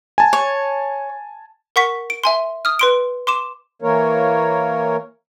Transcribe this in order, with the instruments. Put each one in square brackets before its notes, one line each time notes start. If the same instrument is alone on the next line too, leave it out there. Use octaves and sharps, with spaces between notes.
[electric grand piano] G#5 A5
[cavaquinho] C#5
[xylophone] A#4 F#5 C#6 B6
D7
E5 G#5 C6
D#6 F6
B4 C6 D7
C6 D6 E7
[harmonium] E3 A#3 A#4 C#5